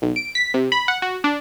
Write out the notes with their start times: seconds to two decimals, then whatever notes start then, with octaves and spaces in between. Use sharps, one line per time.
0.02 B1
0.16 D7
0.35 B6
0.54 C3
0.72 B5
0.88 F#5
1.02 F#4
1.24 D4